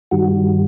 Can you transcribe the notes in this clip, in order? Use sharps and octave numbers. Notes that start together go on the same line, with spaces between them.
G2 D#3 G3 F#4